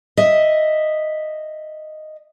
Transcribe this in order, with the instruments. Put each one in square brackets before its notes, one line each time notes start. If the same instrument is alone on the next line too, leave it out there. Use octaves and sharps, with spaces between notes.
[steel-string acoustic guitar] D#5 E5